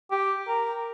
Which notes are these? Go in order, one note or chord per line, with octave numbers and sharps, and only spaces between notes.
G4
A#4